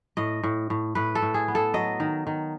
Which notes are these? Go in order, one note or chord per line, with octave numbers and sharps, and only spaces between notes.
A2 D#5
A2
A2
A2 B4
A4
A2
G#4
B3
A4
F#3 D#5
D#3
D#3